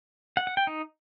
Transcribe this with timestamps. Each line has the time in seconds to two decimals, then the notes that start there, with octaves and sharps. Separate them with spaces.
0.37 F#5
0.47 F#5
0.57 G5
0.67 D#4